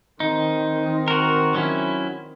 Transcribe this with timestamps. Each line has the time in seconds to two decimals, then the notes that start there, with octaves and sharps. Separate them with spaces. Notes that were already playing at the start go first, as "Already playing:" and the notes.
0.20 D#3 C4 D#4
1.08 F#4 A#4
1.55 F#3 C#4 E4